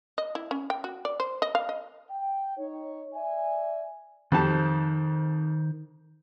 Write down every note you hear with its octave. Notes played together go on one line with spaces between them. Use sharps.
D#5
E4
C#4
G5
F#4
D5
C5
D#5
F5
D#5
G5
D#4 C#5
D5 E5 G#5
F2 D#3 D#4 G4 C5 A5